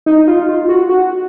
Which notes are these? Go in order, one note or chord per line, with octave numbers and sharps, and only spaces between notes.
D#4
F4
F4
F#4
F#4